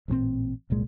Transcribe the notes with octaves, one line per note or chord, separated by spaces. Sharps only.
A1 G2 A#2 C4
F#1 C2 A#2 G#3